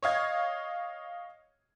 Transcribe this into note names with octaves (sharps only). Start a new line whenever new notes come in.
C#5 D#5 F5 G#6